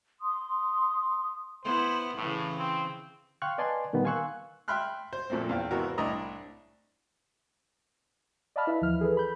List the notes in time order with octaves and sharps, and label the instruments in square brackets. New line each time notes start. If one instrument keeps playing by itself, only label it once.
[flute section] C6 D#6
[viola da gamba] B3 E4 [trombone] C5
[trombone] A2 [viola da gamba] C#3 E3
[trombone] C4
[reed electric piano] F5 G5 C6 C#6 F6 F#6
B4 D5 D#5 G#5 A5 C6
A#2 D#3 G3 A#3 B3
F5 G#5 C6 C#6 E6 F#6
[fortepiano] E5 G5 B5 C6 F6 F#6
C5
F2 A#2 A3 A#3 C4
E2 F5 G5
G#1 C3 E3 B3 F#4 A#4
C2 A2 D4 E4 D#5 A#5
[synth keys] D5 D#5 F5 A5 B5 F6
E4 B4 E5
D#2 E3 F3 F6
G#4 A4 B4
B5 G6